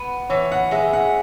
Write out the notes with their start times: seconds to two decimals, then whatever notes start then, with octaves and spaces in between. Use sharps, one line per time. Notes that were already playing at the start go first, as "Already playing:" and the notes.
Already playing: B3
0.30 E3 C#5
0.52 F#5
0.71 G#3 E5
0.93 F#5